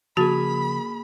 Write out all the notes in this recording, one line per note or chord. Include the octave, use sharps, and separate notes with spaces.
C#3 F3 A#3 F#4 G#4 A5 B5 A6